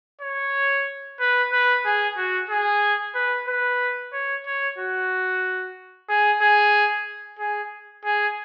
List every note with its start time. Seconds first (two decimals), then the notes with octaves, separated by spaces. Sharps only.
0.21 C#5
1.20 B4
1.52 B4
1.85 G#4
2.17 F#4
2.50 G#4
3.15 B4
3.48 B4
4.13 C#5
4.46 C#5
4.78 F#4
6.09 G#4
6.41 G#4
7.39 G#4
8.05 G#4